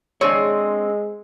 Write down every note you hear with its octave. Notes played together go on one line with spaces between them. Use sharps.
G#3 C4 D4 G#4 C#5